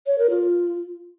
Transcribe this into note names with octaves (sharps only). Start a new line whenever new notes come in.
C#5
A#4
F4